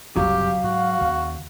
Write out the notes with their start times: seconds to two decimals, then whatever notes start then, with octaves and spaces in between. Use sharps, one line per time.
0.16 F#1 C2 F#3 G4 F5
0.64 G#2 F#4
1.01 D#2 C#3